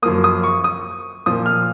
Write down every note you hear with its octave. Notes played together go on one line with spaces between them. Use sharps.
F#2 F3 A#3 D#6
D#6
C#6
D#6
A#2 F3 A#3 D#6
F6